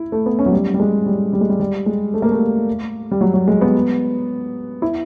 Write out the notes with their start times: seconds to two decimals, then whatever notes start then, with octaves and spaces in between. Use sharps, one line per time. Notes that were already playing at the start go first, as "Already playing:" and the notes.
Already playing: E4
0.12 A3
0.26 B3
0.39 C#4
0.46 F#3
0.52 G3
0.74 G3
0.80 G#3
1.06 G3
1.33 G3
1.41 G#3
1.50 G3
1.60 G3
1.86 G#3
2.14 A3
2.22 A#3
2.31 A3
3.11 G3
3.21 F#3
3.34 F#3
3.48 G#3
3.61 B3
4.82 E4